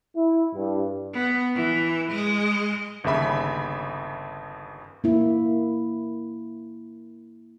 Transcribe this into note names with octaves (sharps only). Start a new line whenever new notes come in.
E4
G2
B3
E3
G#3 D#5
G1 D#2 C#3 E5 B5
A#3 E4